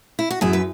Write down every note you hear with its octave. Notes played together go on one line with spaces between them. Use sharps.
E4
F#4
F#2 E4 G#4
B4